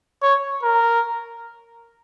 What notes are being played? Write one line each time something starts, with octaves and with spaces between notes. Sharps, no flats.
C#5
A#4